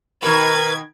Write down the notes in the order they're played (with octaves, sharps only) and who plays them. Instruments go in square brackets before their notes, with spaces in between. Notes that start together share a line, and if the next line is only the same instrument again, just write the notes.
[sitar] B2 D#3 [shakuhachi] A#4 [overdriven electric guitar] B4 [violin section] G#6